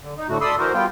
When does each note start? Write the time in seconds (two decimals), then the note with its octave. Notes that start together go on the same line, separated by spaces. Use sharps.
0.01 D3
0.18 D#4
0.29 A2 D3 A3 F#4
0.41 A4 D5 B5 C6 D#6 E6
0.59 E3 F#4 A#4 C5
0.74 G3 B3 F4 G5